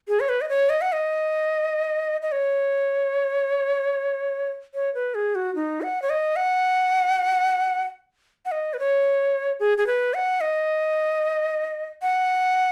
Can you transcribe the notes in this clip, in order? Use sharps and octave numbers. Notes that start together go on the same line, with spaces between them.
G#4
C#5
B4
D#5
C#5
D#5
F#5
D#5
D#5
C#5
C#5
B4
G#4
F#4
D#4
F#5
C#5
D#5
F#5
F#5
D#5
B4
C#5
G#4
G#4
B4
F#5
D#5
F#5